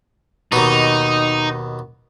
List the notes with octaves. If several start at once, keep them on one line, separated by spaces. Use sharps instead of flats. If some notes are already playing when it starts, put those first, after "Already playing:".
D#2 B2 D#4